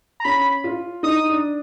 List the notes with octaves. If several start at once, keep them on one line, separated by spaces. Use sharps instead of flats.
A#5
C#4 B5
F4
D#4 D#6
D4